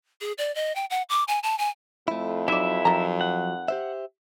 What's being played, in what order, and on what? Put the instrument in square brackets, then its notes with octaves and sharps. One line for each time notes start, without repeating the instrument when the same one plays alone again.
[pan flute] G#4
D5
D#5
G5
F#5
D6
G#5
A5
G#5
[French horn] F2 [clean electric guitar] A3 E4
[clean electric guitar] F#3 [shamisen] D#4 D5 [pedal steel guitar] E4 E5
[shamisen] D#3 A#5 [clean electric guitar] F3 F#3
[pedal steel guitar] F#5
[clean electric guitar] G4 C5 E5